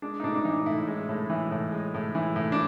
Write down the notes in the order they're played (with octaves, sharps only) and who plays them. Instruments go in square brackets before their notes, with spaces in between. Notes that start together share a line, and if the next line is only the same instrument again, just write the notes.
[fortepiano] G#3 D4
D#4
A2 D4
D4
E3 D#4
A2 E4
G#3
A2
E3
A2
G#3
A2
E3
A2
D4